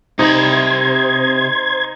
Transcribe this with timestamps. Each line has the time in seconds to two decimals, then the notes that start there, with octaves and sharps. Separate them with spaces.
0.19 C3 D#4 C5 B5 G#6